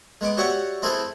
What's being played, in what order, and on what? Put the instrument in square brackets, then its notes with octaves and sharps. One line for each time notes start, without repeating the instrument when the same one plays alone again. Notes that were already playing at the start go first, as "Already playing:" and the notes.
[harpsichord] G#3 B3 D6
F#4 G4 C#5 D5 E5 F#5
C4 E4 G#4 A4 B4